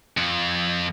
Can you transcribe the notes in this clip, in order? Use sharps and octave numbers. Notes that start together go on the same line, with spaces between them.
F2